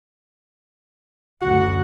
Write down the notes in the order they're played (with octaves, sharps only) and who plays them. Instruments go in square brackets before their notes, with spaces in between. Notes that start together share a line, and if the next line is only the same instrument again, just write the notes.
[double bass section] F#1 D2 D3 [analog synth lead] F#4 [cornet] F#5